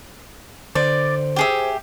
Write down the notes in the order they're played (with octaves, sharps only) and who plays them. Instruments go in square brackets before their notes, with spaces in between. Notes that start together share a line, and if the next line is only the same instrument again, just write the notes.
[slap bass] D3 [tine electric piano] C5 [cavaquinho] D5
[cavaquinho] G4 G#4 E5